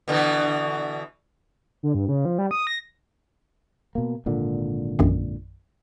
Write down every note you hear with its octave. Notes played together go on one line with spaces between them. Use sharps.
B2 D3 E3
D3
G2
C#3
F3
G3
D#6
A#6
B2 A#3
G#1 A#2 D3
A#1 F#2 D#3